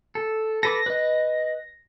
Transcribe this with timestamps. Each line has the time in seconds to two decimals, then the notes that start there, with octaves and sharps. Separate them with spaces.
0.15 A4
0.63 A4 B4 D6 A#6
0.86 B4 D#5